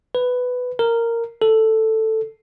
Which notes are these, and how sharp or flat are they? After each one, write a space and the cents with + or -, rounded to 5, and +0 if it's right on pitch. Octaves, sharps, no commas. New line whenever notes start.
B4 +10
A#4 -10
A4 +5